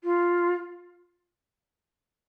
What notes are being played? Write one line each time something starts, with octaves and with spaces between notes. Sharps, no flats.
F4